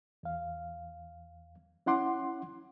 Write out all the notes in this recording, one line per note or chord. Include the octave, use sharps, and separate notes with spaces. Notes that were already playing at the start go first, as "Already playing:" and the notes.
E2 F5
C#4 E4 F#5 C6 D6